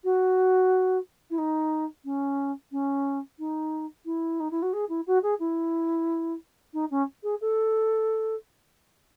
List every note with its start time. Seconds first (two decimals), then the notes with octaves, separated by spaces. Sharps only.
0.04 F#4
1.30 E4
1.38 D#4
2.05 C#4
2.72 C#4
3.39 D#4
4.05 E4
4.40 D#4
4.51 E4
4.62 F#4
4.73 G#4
4.89 E4
5.07 F#4
5.23 G#4
5.40 E4
6.73 D#4
6.91 C#4
7.23 G#4
7.41 A4